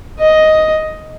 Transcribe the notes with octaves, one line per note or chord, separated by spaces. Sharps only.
D#5